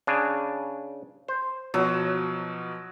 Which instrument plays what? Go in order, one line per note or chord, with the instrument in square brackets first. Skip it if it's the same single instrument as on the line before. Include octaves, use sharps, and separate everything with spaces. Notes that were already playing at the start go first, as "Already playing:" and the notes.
[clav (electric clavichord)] C#3 D4 G#5
C5
[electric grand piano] B2 F3 [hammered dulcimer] F#3